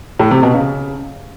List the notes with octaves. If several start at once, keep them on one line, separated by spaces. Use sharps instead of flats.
A2
C3
B2
C#3